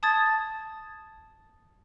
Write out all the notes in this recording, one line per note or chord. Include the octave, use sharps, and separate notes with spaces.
A5 D#6 G#6 A6